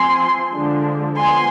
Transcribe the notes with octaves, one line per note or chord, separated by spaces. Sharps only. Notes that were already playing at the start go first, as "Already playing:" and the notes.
Already playing: F3 C4 G#5 C6
D3 F3 G#3 D4
F3 B3 G#5 C6